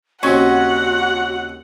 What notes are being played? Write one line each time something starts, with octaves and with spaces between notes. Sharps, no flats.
D#2 C#3 C4 C#4 F#4 F#5